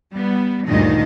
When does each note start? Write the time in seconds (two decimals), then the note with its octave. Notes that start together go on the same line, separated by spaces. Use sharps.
0.13 G3 B3
0.68 D2 G2 A#2 D#3 D#4 D#5